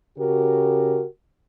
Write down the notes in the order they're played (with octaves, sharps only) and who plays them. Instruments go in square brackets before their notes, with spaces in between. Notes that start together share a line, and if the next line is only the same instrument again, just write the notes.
[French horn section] C#3 F#4 G4 A#4